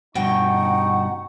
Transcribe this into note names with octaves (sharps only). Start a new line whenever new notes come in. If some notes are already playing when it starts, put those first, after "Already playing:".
G2 B2 D#4 F#5 G5 C#6